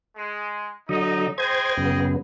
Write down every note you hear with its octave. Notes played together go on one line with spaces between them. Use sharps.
G#3
D3 F#3 D#4 D#5
G#4 C5 D#5 G5 G#6
F#2 C#3 B3